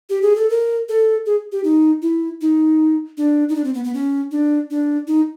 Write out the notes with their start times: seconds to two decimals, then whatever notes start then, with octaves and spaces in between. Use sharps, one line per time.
0.10 G4
0.22 G#4
0.36 A4
0.49 A#4
0.89 A4
1.26 G#4
1.52 G4
1.64 D#4
2.02 E4
2.41 D#4
3.17 D4
3.49 D#4
3.56 D4
3.64 C4
3.74 B3
3.84 B3
3.94 C#4
4.31 D4
4.70 D4
5.07 D#4